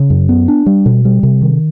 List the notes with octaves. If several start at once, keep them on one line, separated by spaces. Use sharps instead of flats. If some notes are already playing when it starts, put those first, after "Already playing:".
Already playing: C#3
F#2
B3
D4
G3
B2
G3
C3
D#3